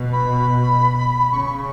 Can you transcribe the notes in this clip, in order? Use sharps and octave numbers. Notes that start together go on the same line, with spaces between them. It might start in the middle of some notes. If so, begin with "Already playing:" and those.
Already playing: B2
B5
C#3 C#6